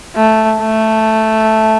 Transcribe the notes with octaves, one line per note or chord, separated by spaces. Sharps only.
A3
A3